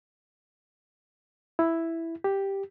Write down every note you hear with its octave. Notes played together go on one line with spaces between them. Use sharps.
E4
G4